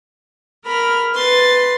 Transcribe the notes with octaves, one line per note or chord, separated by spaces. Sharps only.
A#4 B5 F6
B4 C6 A6